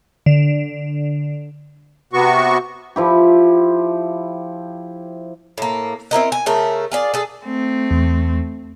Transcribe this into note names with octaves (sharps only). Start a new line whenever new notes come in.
D3
C3 B3 F#4 C#6
F3 E4 G4
A2 A#3
C4 E4 A#4 D#5
G#5
C#3 A3 A#4
F4 G#4 D5
G#4 A4
A3 C4
E2